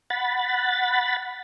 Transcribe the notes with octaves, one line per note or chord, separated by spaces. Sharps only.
F#5 B5 A6